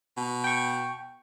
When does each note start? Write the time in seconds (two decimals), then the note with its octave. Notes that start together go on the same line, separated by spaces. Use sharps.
0.17 B2
0.44 G5 C#6